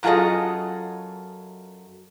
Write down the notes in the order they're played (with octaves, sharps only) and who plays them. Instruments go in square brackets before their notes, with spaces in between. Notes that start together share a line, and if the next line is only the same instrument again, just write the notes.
[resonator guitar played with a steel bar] F#2 F#3 F4 G#4 A4 D#5